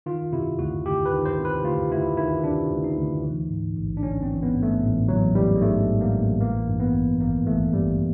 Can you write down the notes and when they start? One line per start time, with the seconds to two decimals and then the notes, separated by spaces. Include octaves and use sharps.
0.06 D#3 F4
0.33 C3 E4
0.59 D2 F#4
0.86 D2 G4
1.05 B4
1.12 D#3
1.25 C5
1.39 C3
1.45 B4
1.64 D2 F4
1.91 D2 E4
2.17 D#3 E4
2.44 C3 D4
2.71 D2
2.84 D#4
2.97 D2
3.24 E3
3.50 G#2
3.77 A1
3.97 D4
4.03 A1 C#4
4.23 C4
4.29 E3
4.43 B3
4.56 G#2
4.63 A3
4.82 A1
5.08 A1 F#3
5.35 E3 G3
5.55 G#3
5.61 G#2 A3
5.88 A1
6.01 A#3
6.14 A1
6.41 E3 A#3
6.68 G2
6.80 B3
6.94 G#1
7.21 G#1 A#3
7.46 E3 A3
7.73 G2 G3